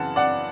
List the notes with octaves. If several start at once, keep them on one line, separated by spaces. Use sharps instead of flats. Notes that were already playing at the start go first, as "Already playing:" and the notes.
Already playing: F#2 C#3 E3 F#5 A5
D5 F#5